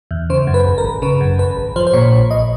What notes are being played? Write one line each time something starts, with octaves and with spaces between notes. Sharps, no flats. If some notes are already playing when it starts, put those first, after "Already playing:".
E2
C#3 C5
F#2
B4
G#1
A#4
G#1
C#3 B4
F#2
G#1 B4
G#1
F3 C5
C5
A#2 C#5
A#1
A#1 D#5